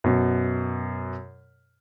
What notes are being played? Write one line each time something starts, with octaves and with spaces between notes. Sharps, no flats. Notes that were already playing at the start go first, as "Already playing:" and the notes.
F#2 B2